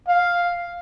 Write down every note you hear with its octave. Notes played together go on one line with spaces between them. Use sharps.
F5